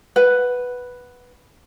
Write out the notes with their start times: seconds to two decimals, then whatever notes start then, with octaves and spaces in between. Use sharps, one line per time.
0.16 B4 F#5